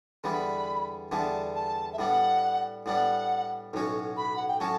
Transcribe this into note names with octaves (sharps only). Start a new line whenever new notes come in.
E2 D3 G3 B3 E4 B5
E2 D3 G3 B3 E4 A5
A5
E5
A2 G3 B3 D4 F#5
A2 G3 B3 D4 F#5
B1 A2 F#3 C#4 F#4
B5
F#5
G5
A2 F#3 C#4 F#4 A5